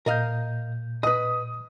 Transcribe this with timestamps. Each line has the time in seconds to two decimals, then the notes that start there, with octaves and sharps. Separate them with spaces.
0.06 A#2 A#4 D#5 F5 G6
1.03 B4 D#5 D#6